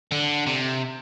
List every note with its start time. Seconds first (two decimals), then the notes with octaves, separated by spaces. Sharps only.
0.12 D3
0.46 C3